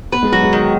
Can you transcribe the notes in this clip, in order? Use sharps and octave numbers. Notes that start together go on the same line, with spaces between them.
B3 B4
G#3
F#3 F#4
G#3
D#3